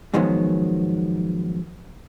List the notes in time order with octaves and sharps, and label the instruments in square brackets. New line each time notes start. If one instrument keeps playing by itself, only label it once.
[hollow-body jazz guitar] G#2 D#3 F3 F#3 G#3 B3